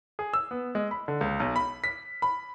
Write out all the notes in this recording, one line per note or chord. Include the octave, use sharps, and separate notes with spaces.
G#4
E6
B3
G#3
B5
D3
C#2
B1
B5
B6
B5